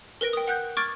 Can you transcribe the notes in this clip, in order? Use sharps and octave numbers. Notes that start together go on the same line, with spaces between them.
A#4 B4 A#6 D7
G5 D#6
F#5 F#6 G6
C#6 D6 F6 G#6 A6 D7